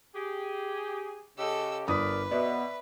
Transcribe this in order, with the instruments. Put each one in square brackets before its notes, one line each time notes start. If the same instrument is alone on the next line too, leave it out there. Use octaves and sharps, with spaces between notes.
[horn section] G4 G#4
[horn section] C#3 G4 [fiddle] A4 E6 [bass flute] D#5
[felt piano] G1 D#6 [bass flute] A#4 [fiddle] B4 [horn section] D5
[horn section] B2 [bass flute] B3 [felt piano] D5 E5